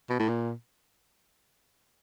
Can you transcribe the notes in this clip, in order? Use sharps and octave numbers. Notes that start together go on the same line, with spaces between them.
B2
A2
A#2